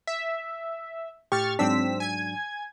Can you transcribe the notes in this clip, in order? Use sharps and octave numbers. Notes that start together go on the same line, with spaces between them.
E5
A2 G4 C#6 F6 A6
G#2 F#3 C4 D4 E6 B6
G#5 G#6